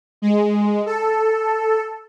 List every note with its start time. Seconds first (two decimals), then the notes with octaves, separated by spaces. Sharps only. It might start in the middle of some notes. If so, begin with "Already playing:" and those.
0.22 G#3
0.86 A4